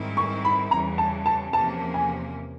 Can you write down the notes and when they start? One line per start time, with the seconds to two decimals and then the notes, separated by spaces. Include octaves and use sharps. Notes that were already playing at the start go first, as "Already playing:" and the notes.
Already playing: G#2 D#3 G3 C4 E4
0.17 C#6
0.45 B5
0.71 E2 C#3 E3 G3 A#5
0.98 A5
1.26 A5
1.53 E2 C3 F3 A#3 C#4 A5
1.94 G#5